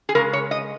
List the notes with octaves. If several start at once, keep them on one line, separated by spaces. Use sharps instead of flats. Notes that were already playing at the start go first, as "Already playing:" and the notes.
G#4
C#3 G#3 C#4 A#4
C#5
D#5